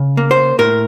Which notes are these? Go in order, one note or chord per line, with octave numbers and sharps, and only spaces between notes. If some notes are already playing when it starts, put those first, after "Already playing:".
Already playing: C#3
A#3
C5
A2 A#4